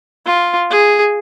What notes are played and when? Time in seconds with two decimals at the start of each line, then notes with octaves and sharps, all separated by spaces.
0.26 F4
0.70 G#4